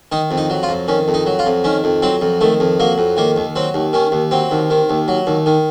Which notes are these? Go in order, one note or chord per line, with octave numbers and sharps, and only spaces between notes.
D#3 D#4
F2
D#4
F#3
F4
F2
D#3 C#4
F2
D#4
F#3
F4
F2
D#3 C#4
F2
F#3 C4
F2
D#3 A3
F2
F#3 A#3
F2
D#3 A#3
D#2
F#3 C4
D#2
D#3 C#4
D#2
F#3 C4
D#2
D#3
D#2
F#3
D#2
D#3